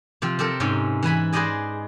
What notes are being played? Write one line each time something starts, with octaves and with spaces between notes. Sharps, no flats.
C3 F3 C4
C4 G4 A4 A#4
G#2 C3 C#4 G5
E3 B4 G#5 B5
G#4 B4 C5 D5 D#5 G#5